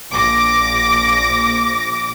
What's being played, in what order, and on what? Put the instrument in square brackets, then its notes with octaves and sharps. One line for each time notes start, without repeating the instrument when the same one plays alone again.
[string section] A#1 D6 A#6